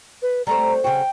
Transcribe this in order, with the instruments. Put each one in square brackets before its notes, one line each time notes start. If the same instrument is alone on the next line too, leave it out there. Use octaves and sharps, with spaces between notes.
[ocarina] B4
[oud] G3 A3 C4 [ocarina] A#5
[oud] C#3 F#3 F#4 [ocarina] G5